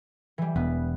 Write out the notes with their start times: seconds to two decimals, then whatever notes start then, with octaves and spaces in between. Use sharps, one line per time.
0.38 E3 G3
0.56 E1 B3